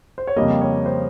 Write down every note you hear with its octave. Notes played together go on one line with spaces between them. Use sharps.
C5
C#5
F2 C#3 G3 A#3 D#5
C#5
C5